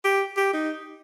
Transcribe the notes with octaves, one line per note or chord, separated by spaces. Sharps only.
G4
G4
D#4